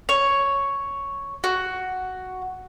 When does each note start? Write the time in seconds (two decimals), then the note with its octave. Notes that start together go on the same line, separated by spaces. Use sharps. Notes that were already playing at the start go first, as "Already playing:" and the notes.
0.09 C#5
1.44 F#4